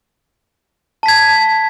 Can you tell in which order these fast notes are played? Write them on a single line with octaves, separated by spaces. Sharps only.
A5 B6 G#6